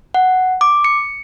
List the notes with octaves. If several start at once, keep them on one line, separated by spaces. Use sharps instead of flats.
F#5
D6
C#7